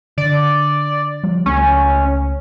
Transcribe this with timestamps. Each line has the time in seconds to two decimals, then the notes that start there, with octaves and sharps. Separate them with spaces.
0.18 D3 D5
1.24 F3 G3
1.46 C#2 A3 C#4